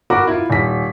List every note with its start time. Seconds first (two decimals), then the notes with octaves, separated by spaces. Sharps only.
0.10 F#4 A#4 B5 D6
0.27 E4 F4
0.50 D#1 B6